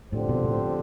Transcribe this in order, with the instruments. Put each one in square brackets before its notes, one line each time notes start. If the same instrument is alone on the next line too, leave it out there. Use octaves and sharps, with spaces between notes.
[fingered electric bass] A2 [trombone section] D3 F3 C4 G4 C5
[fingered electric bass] B2
A2